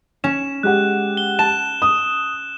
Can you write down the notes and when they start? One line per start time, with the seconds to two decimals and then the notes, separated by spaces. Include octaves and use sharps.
0.24 C#4 E7
0.63 G#3 G4 F#5 F#6
1.17 G7
1.39 A5 E7
1.82 D#6